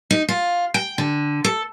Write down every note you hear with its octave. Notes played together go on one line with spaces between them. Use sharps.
D#4
F4
G5
D3
A4